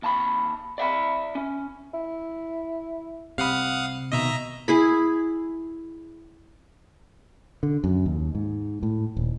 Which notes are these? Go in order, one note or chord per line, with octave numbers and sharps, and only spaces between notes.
D#2 A5 B5
D5 E5 F#5 B5
C#4
E4
C2 C3 F5 F#5 B5 D#6
B2 D#3 D#5 E5 A#5
E4 G#4 B5
D3
F#2
D#2
G#2
A2
D#1